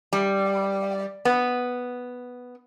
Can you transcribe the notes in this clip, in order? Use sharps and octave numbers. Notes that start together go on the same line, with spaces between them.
G3
B3